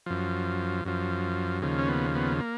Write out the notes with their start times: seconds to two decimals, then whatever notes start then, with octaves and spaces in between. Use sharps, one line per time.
0.06 F#2 F3
0.85 F#2 F3
1.62 D#2 C#3 F3
1.79 C#4
1.88 B3
2.15 B3
2.40 A#3